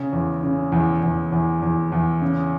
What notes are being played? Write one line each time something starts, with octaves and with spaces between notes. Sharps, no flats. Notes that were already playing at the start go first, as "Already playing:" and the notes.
Already playing: C#3
E2
C#3
E2
E2
E2
E2
E2
C#3